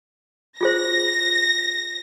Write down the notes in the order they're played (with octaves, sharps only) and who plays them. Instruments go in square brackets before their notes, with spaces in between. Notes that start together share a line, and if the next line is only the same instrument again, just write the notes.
[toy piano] F4 G#4 C5 [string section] A#6